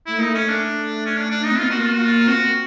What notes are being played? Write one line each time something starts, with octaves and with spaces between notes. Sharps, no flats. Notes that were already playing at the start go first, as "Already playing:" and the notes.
A3 E4
A#3 D#4
A3 C#4
D4
C#4
D4
D4
D#4
C4
B3 F4
A#3 F#4
F4
F#4
F4
C4 F#4